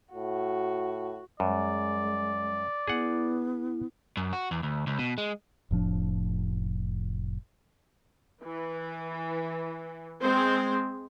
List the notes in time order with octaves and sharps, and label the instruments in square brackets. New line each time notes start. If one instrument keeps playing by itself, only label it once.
[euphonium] A2 [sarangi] F#4
[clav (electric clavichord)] F#2 [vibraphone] G3 [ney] G#3 [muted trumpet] D5
[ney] B3 [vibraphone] E4 [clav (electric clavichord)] G#4 F#5
[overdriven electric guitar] F#2
F#4
E2
D2
C#2
B2
G#3
[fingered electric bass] F1 A2 F3 D4
[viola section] E3
G#3 C4 C5